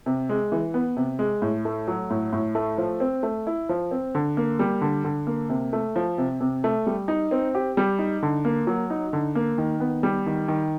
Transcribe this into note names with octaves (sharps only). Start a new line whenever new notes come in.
C3
G#3
E3
B3
C3
G#3
A2
A3
F#3
A2
A2
A3
F3
C4
A3
E4
F3
C4
D3
A#3
G3
D3
D3
A#3
C3
A3
F3
C3
C3
A3
G3
D#4
C4
G4
G3
D#4
D3
A#3
F#3
D#4
D3
A#3
D#3
B3
G3
D#3
D#3